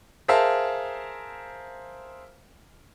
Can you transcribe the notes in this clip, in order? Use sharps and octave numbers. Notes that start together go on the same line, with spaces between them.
G#4 A#4 C5 E5 F5 A5